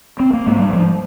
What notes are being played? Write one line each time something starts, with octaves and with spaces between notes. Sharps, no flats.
C4
A#3
G#2 G#3
G3
F3